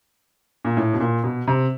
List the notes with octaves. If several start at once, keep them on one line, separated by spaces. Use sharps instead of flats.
A#2
A2
B2
A#2
B2
C3